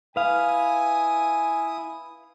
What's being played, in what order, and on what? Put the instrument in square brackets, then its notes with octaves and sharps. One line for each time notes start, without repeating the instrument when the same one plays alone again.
[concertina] E4 D#6 [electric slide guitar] B4 F5 [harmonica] G#5